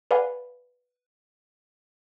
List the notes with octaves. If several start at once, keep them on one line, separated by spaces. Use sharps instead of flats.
B4 D5 F5 F#5 G#5 B5